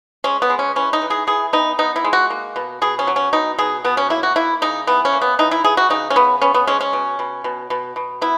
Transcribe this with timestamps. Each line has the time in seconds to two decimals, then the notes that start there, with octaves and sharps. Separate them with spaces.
0.24 G#3 C#4
0.42 B3
0.50 G#3
0.59 C#4
0.76 E3 C#4
0.93 D#4
1.02 E3
1.10 G#4
1.27 E3 G#4
1.53 B3 D#4
1.79 B3 D#4
1.96 E4
2.04 G#3
2.13 F#4
2.30 A#3
2.56 B2
2.82 B2 G#4
2.99 C#4
3.07 F#3
3.16 C#4
3.33 B2 D#4
3.58 B2 G#4
3.84 B2 B3
3.97 C#4
4.10 A#3 E4
4.23 F#4
4.36 A#3 E4
4.62 C#3 D#4
4.87 E3 B3
5.05 C#4
5.13 A#3
5.22 B3
5.39 E3 D#4
5.51 E4
5.64 E3 G#4
5.77 F#4
5.90 C#3 D#4
6.10 C#4
6.16 C#3 B3
6.42 B3 C#4
6.54 B3
6.67 G#3 C#4
6.80 C#4
6.93 B2
7.19 B2
7.44 B2
7.70 B2
7.96 B2
8.21 B3 E4